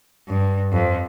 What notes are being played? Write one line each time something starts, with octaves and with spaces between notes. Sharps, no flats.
G2
F2